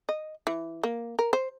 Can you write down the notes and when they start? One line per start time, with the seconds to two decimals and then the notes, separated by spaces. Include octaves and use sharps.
0.09 D#5
0.47 E3
0.83 A#3
1.19 A#4
1.33 C5